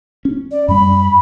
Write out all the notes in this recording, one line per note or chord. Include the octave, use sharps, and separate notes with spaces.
C#4
D5
F#2 G3 B5